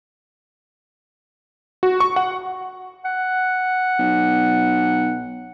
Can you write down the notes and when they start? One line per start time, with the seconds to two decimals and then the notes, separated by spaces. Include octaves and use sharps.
1.83 F#4
2.00 C#6
2.16 F#5
3.05 F#5
3.99 B1